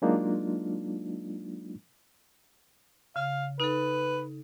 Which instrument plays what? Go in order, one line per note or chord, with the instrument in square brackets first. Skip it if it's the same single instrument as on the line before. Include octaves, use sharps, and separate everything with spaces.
[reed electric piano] F#3 G#3 A#3 D4 D#4 F4
[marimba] C#3 [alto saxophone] F5
[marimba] D#4 A4 [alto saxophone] B4